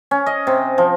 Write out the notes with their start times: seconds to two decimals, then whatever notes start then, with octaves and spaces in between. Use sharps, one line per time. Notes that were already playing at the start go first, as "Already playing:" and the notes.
0.11 C#4
0.26 D#5
0.47 C3
0.78 F3